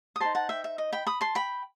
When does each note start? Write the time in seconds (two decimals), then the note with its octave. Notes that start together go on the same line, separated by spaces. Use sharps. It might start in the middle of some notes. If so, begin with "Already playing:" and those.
0.16 D#6
0.20 D#4 A4 C5 A5 C6
0.35 F#5 A5
0.49 E5 G5
0.64 E5
0.78 D#5
0.92 G5 B5
1.07 B5 D#6
1.21 A5 C6
1.35 G5 B5